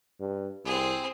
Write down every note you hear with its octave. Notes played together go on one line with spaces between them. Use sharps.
G2
C2 C4 G#4